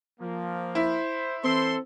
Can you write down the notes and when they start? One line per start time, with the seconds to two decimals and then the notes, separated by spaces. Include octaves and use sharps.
0.20 F3 A#3
0.75 E4 C5
1.44 E3 C4 A4 C5 C6